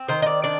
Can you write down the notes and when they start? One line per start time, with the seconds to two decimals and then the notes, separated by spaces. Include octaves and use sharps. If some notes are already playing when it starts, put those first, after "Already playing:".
Already playing: C4
0.08 D#3 C5
0.22 D#5
0.27 D5
0.44 D4 D5